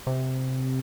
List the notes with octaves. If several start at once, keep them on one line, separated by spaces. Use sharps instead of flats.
C3